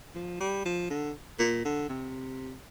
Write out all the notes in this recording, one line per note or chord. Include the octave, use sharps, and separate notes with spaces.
F3
G3
F3
D3
A#2
D3
C3